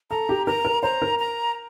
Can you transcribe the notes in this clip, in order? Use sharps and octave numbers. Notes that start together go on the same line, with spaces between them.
A4 A#5
G4
A#4 A#5
A#4
C5 A#5
A#4
A#5